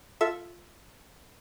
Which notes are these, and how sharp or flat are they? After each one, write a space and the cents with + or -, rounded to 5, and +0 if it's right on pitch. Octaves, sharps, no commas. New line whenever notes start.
F4 +0 A4 +0 E5 +0